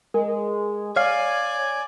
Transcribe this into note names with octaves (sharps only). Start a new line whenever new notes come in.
G#3 A#4
C#5 D5 F5 G#5 F6